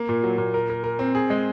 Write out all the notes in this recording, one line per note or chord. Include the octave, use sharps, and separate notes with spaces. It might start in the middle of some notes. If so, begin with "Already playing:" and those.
Already playing: A#3
A#2
F#3
A#2
A#4
A#4
A#4
C4
G#4
G#3